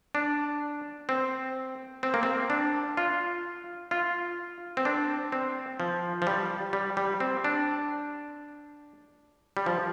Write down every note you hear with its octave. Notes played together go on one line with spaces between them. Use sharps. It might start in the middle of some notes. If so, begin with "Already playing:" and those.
D4
C4
C4
A#3
C4
D4
F4
F4
C4
D4
C4
F3
F3
G3
G3
G3
C4
D4
G3
F3